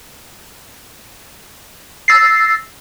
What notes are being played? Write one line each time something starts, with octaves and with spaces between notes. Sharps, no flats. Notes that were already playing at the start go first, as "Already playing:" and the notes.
E6 A6 A#6 C7